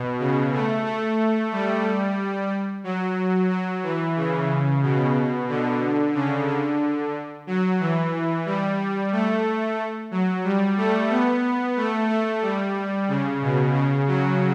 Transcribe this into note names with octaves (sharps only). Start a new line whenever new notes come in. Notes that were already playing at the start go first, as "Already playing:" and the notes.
Already playing: B2
C#3
A3
A3
G3
F#3
F#3
E3
C#3
B2
D3
C#3
D3
F#3
E3
G3
A3
F#3
G3
A3
B3
A3
A3
G3
C#3
B2
C#3
F#3